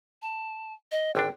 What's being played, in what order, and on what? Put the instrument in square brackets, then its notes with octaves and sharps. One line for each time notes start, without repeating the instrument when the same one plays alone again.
[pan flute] A5
D#5
[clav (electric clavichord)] G#1 D3 D4 [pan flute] G5